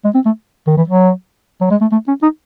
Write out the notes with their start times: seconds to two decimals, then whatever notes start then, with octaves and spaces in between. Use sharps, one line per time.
0.05 G#3
0.15 C4
0.26 A3
0.67 D#3
0.77 E3
0.88 F#3
1.61 F#3
1.71 G#3
1.81 A3
1.92 A3
2.08 C#4
2.23 D#4